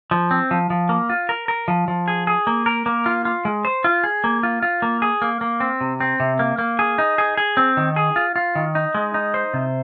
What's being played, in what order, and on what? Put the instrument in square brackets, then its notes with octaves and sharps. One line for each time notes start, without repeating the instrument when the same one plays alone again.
[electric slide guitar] F3
C4
F3
F3
A#3
F4
A#4
A#4
F3
F3
G#4
G#4
A#3
A#4
A#3
F4
F4
G#3
C5
F4
G#4
A#3
F4
F4
A#3
G#4
A#3
A#3
C4
C3
C4
C3
A#3
A#3
G#4
D#4
G#4
G#4
C4
D#3
G#4
F4
F4
D#3
D#4
G#3
D#4
C5
C3